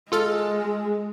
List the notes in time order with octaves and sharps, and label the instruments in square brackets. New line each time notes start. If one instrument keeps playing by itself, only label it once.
[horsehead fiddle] G#3 [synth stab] F4 A4 F6